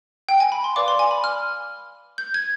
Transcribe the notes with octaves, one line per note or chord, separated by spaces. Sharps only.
G5
G#5
B5
C6
B4 D5 F5 D6
C6
G#5
B5
F6
G6
G#6